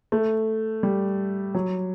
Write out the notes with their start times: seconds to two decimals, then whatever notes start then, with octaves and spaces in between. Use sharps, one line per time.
0.12 A3
0.83 G3
1.55 F#3